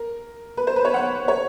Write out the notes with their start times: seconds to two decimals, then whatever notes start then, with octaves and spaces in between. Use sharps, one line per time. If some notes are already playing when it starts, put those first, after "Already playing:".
Already playing: A#4
0.57 B4
0.67 C5
0.76 B4
0.85 C#5
0.94 F#5
1.28 C#5